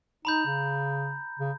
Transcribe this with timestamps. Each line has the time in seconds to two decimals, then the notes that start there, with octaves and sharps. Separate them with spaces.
0.25 D#4 A#5 B5 G6
0.46 C#3
1.39 C#3